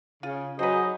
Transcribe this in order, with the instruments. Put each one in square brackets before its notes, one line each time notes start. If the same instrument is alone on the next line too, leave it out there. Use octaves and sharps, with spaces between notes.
[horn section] C#3 [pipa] F4
[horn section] F#3 D#4 [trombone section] F#4 G#4 [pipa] B4 C5 [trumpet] D#5